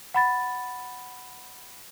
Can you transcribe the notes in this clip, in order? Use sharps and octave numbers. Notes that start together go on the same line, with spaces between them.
F#5 B5 A6